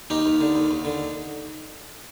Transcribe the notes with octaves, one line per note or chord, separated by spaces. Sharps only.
D#2 D#4 G4
D#2
D3
D#2
D#2
D3